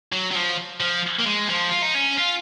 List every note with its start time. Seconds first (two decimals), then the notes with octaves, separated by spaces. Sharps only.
0.12 F#3
0.31 F#3
0.35 F3
0.80 F3
1.19 A#3
1.26 G#3
1.49 F3
1.70 F4
1.82 D#4
1.94 C#4
2.17 F4